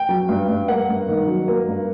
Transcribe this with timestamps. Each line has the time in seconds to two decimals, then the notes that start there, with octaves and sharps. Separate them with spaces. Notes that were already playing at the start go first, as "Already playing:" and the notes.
Already playing: G5
0.09 F#3
0.29 G2
0.48 G2
0.68 A#3 F#5
0.89 G2
1.08 D#3
1.27 F#3
1.48 A#3
1.67 G2